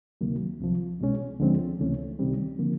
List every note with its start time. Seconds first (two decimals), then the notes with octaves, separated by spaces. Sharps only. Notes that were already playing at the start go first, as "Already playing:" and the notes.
0.21 D2 C3 D#3 F#3 A#3
0.60 C2 C3 F3
1.00 C2 B2 G#3 C#4
1.39 D2 D3 F3 G#3 C4
1.79 C#2 C3 E3 A3 C#4
2.19 C2 C3 D#3 G3 C4
2.58 D3 F3 A#3